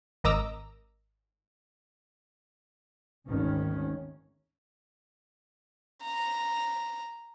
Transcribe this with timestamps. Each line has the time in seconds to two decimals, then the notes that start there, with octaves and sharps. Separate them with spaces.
0.24 G#1 A#4 D#5 A#5 D6 E6
3.28 G#1 D2 D#3 C#4
6.05 A#5